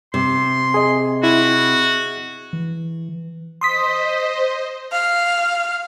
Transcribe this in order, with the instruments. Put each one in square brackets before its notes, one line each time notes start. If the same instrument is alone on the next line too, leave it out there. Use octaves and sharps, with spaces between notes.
[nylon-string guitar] C3 [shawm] C6
[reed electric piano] G#4 D#5
[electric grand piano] E4 [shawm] F#4
[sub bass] E3
[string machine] C5 D#5 [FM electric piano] C6 D#6 B6
[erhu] F5